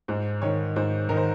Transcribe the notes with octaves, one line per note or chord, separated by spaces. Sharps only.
G#2 C5
D#3 C#5
G#2 C5
D#3 A#4
C5